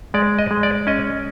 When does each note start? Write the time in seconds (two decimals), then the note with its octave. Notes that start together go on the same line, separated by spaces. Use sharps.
0.14 G#3 D5
0.39 D#5
0.51 G#3
0.63 D5
0.87 C#4 D#5